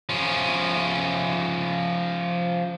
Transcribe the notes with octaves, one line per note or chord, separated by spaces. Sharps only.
F3 C#4